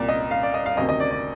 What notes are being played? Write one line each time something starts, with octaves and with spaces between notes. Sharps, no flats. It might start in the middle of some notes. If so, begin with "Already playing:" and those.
Already playing: C2 A#2 D5
D#5
F5
D5
D#5
F5
D2 C3 D#3 D#5
D#5
D5
D5